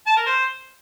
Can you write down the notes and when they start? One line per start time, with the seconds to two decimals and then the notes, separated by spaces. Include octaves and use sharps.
0.07 A5
0.16 A#4
0.26 C5